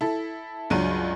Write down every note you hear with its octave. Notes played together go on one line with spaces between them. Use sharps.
E4 A4
C#2 G2 F#3 D4 D#7